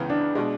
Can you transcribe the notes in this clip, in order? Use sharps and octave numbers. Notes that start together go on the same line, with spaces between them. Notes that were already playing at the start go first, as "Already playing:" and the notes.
Already playing: C#2 C#3 E3 B3
D4
B2 G#3